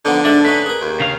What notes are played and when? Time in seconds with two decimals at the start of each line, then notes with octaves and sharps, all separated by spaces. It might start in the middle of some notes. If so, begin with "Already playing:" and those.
0.05 D3 F3 B3 D#4
0.25 G#2 D4 E5
0.45 A3 C#4 D#4 B4
0.66 G#4 A#4
0.81 D#2
1.00 C#3 F5